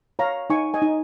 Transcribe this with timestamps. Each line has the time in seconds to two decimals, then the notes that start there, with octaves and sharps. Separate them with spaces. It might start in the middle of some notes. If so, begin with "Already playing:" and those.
0.19 C#5 F5 A#5
0.50 D#4 G#5 C#6
0.74 D#5 G#5
0.82 D#4